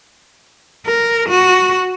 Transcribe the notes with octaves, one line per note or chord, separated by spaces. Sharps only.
A#4
F#4